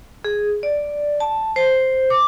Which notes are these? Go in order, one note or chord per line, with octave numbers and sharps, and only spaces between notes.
G#4
D5
A5
C5
D6